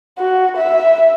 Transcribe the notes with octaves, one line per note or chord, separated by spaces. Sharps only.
F#4
E5